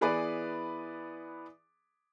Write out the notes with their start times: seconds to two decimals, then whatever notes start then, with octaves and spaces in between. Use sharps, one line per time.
0.01 E3 B3 G#4 B4 D5